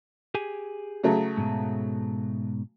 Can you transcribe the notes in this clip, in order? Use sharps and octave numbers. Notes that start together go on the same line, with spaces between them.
G4 G#4 G#5
C#3 F#3 A3
G#2 B2